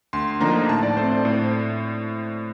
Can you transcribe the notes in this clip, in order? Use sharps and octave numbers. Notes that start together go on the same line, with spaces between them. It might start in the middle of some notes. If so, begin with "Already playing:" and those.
D2 C6
D3 F3 A#3 D#4 A#5
A2 A5
D5
A3 C4 C5
C5
A2 C5